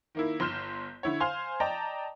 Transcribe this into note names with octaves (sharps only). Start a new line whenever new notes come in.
D#3 A#3 E4
G1 C6 F6 G6 E7
D3 E4 C#5
C5 F5 G#5 C6 F6 F7
D5 D#5 G5 A5 A#5